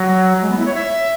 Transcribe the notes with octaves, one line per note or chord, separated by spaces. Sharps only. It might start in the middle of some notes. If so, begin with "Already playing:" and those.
Already playing: F#3
G#3
B3
E4
C#5
E5